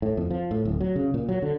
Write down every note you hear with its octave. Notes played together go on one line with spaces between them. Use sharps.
A2
F2
F3
A2
D1
F#3
C#3
A#2
F#3
D3